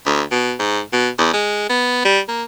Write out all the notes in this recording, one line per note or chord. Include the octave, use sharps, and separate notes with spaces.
D2
B2
G#2
B2
E2
G#3
B3
G3
A#3